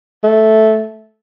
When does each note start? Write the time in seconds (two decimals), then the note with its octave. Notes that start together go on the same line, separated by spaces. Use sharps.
0.24 A3